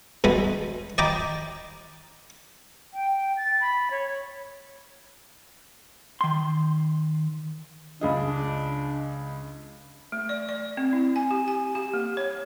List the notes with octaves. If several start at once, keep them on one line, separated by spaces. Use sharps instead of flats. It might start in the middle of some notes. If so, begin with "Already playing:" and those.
B2 G3 G#3 B5
D5 D#5 G5 A#5 B5 D6
G5
A6
B5
C#5
D#3 C6
C#2 D4 G#4 D#5
A3
D5
D5
C4
E4
G#5
G4
G#5
G4
A#3
C#5